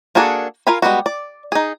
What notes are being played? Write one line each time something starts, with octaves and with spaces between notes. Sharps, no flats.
A#3 D4 F#4 G#4 A4
F4 A#4 F5 G#5 B5
G3 G#3 B3 F#4
D5
D#4 G#4